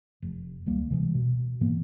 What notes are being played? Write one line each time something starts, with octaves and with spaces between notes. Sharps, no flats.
F1
D#1 C#2 G3 A#3
C3 E3 G#3
B2
G#2 E3 A#3 B3